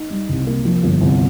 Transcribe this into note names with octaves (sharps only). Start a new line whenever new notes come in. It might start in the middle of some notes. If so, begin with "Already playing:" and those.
Already playing: D#4
G3
C2
A#3
F3
G1
C2